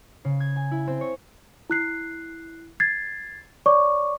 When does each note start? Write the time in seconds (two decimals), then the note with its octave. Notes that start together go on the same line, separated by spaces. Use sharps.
0.25 C#3
0.40 G#6
0.56 G#5
0.71 E4
0.87 C4
1.01 C#5
1.70 E4 F#6 C7
2.80 G#6 A6 C7
3.66 C#5 D5 C#6 D6